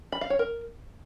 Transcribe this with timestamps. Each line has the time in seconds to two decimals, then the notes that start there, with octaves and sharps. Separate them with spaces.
0.12 B5
0.21 F5
0.30 C#5
0.39 A#4